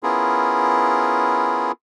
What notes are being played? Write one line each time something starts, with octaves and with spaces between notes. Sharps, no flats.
B3 C#4 E4 F4 G#4 A#4